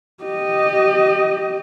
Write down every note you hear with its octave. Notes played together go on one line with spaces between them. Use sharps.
G4 D#5